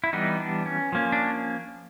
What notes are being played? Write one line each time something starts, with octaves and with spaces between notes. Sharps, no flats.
E4
E3 G3 B3 D#4
D4
C#4
F3 A#3 C#4
D4